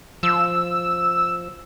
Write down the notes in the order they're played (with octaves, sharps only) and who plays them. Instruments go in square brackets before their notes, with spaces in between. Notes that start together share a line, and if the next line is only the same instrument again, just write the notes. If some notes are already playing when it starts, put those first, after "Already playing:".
[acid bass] F3 [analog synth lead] E6